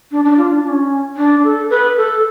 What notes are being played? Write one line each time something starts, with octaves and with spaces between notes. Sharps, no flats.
D4
D4
F4
D4
D4
C#4
D4
A4
B4
A4